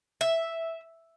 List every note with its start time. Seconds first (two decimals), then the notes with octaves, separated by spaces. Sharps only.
0.21 E5